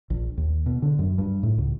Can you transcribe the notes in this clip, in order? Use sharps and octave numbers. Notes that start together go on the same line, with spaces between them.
A#1
D#2
B2
D3
F#2
G2
A2
C#2